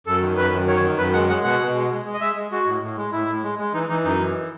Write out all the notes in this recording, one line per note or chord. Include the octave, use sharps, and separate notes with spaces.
F#2 A4
D#3
F#2 B4
F#2
D#3 C#5
D#3
F#2 B4
G#3 F#5
G#3 F#5
B2 F#5
B2
G#3
G#3
G#3
D#5
G#3 E5
G#3
G#3 F#4
A2
A2
G#3
A2 E4
A2
G#3
G#3
E3 D#4
E3 D#4
F#2 D#4
E3